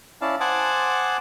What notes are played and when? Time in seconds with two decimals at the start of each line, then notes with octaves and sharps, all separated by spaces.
0.21 C#4 E4 D5 F5 A5
0.40 C5 F#5 G#5 A5 D6 D#6